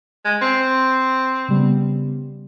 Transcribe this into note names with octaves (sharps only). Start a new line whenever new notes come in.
G#3
C4
C#3 G3 B3